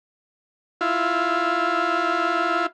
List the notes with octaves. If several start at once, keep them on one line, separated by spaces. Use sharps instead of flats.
E4 F4